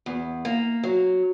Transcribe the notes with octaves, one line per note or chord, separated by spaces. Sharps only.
E2
A#3
F#3